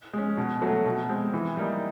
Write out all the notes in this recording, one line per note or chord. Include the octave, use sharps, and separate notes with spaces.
G#3 C#4
B2
F#3 A3
B2
G#3 C4
E3
G3 A#3 D#4